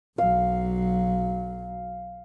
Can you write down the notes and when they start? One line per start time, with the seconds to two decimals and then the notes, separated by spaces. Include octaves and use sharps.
0.18 B1 F#3 F5